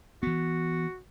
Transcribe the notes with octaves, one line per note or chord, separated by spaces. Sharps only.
E3 B3 F#4